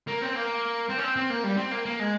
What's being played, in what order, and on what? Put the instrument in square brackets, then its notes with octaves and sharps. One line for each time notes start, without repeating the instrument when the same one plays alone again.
[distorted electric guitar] A#3
C4
A#3
C4
C#4
C4
C4
A#3
G3
C4
A#3
A#3
G#3